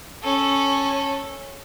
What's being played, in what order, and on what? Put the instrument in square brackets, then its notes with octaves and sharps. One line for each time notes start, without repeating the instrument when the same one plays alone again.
[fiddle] C#4 A4